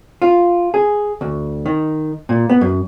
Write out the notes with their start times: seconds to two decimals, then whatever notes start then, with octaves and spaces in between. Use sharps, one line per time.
0.22 F4
0.74 G#4
1.21 D2
1.66 D#3
2.29 A#2
2.49 B3
2.61 F#2